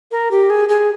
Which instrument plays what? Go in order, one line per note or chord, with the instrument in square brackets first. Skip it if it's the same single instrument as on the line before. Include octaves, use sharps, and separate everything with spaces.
[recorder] A#4
G4
G#4
G#4